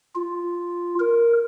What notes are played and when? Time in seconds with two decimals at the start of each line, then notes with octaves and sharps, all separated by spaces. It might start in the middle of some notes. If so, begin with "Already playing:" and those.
0.16 F4
1.00 A#4